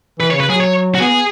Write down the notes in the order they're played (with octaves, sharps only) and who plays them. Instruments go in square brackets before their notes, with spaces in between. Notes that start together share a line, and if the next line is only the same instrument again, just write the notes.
[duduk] E3 [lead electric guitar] B4
[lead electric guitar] C#5
[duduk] C#3
[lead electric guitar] B4
[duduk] F#3 [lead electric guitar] G#4
[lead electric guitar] C#5
F#4
[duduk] B3 [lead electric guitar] G#4
[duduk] B3